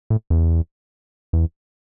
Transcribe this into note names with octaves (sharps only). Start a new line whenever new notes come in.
A2
E2
E2